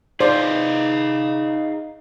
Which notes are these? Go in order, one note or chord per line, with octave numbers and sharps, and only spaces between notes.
D#4 G#4 C5 D5 D#5 F5